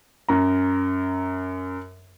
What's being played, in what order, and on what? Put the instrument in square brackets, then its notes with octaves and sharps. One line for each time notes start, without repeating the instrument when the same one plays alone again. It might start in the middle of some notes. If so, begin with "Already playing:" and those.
[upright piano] F#2 A#5